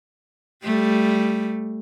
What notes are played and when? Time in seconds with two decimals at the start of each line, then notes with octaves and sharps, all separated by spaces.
0.63 G3 A3